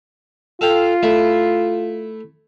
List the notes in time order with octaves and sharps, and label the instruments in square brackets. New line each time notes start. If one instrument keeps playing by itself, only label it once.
[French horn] F4 [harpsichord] A4 F5 G5
[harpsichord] A3 E4